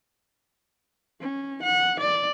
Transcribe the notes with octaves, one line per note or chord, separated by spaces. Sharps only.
C#4
F#5
D5